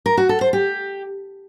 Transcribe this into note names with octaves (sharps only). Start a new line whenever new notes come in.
A#4
F#4
A4
C5
G4